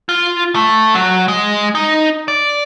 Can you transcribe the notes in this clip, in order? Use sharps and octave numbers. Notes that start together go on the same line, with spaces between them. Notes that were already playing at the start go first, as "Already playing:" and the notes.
F4
A3
F#3
G#3
D#4
D5